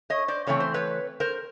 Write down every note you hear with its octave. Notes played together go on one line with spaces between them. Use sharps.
C#5 D#5
C5 D5
C#3 E3 A3 C4 C#5
C5
B4 C#5
A#4 C5